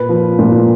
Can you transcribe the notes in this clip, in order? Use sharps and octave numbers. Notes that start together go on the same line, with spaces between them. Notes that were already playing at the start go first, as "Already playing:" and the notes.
Already playing: A#2 B4
F3
A#2